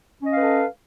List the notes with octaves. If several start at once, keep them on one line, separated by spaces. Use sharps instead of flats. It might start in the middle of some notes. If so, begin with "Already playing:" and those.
C#4 A4 B4 D#5 F5